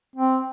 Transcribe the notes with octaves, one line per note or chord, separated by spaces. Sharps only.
C4